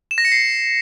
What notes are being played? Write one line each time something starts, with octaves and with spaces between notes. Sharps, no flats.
E7
A#6
C#7
C7